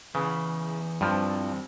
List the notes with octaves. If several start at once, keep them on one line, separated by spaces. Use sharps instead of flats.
E2 C#3 E3 B4
G2 F3 G3 C4